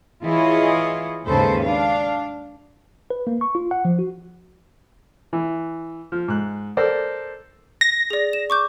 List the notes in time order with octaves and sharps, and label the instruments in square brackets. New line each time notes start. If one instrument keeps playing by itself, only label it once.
[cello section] E3 E4 F4 G#4 C#5 D#5
D#2 G#2 C#3 A4 B4 C5
D4 F5
[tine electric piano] B4
A#3
C#6
F4
F#5
F3
F#4
[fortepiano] E3
F3
G#2 F#6
A4 A#4 C5 D5
[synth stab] A#6
[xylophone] G#4 D5
E7
C#6 D6 G6